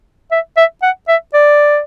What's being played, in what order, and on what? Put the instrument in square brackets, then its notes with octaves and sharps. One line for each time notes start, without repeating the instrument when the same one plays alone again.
[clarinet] E5
E5
F#5
E5
D5